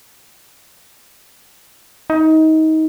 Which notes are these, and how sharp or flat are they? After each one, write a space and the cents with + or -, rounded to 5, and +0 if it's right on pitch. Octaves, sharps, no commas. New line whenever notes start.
D#4 +25